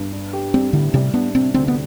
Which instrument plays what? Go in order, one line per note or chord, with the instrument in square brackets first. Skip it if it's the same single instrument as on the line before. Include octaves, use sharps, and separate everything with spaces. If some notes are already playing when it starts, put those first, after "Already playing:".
Already playing: [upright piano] G2
D4
G4
[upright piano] G3 [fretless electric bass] C4
[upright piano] A2 [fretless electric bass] D3
[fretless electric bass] C3 [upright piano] G3
[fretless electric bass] B3 [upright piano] D4
[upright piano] C3 [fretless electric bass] C4
[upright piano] D2 [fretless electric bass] C4
[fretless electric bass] B3